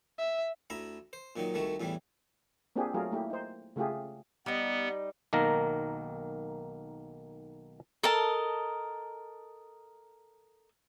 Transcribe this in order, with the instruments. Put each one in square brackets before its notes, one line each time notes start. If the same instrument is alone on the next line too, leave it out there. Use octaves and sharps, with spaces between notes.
[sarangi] E5
[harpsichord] D2 E4 A#5 B5
C5
A#2 D#3 F#3 D#4
C2 D#3 A3 F#4
E2 A2 E3 G3
[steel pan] A#3 C4 D4 F4 G4 G#4
F#3 A3 F4 G#4 A#4
A3 A#3 E4 G4
D#4 C5
C#3 A3 F4 G4 G#4
[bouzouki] G3 D#4 [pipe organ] B3
[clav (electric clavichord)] B1 D#3 A#3 A#4 A#5
[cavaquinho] A4 A#4 D#5 A5